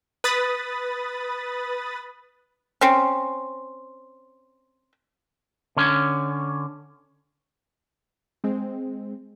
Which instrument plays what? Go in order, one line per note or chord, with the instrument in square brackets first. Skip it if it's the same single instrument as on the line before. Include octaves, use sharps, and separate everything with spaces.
[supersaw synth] B4 B5 D#6 A6
[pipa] C4 C#4
[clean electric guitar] D3 C#4
[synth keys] G#3 C4